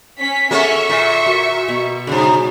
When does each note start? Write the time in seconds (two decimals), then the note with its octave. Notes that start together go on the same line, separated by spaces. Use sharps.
0.20 C#4 B6
0.51 A#3 C#4 G#4 A4 E5 F#5 C#6
0.89 A#2
1.26 F#4 A#4
1.68 B2
2.07 G2 C#3 G#4 F#5 B5